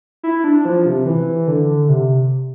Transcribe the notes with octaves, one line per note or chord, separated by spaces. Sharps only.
E4
D4
F3
C3
E3
D3
C3